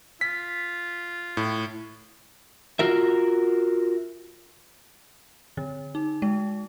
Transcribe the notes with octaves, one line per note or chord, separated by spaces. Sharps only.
F4 B6
A2
F4 F#4 A#4 E5
D3
D#4
G#3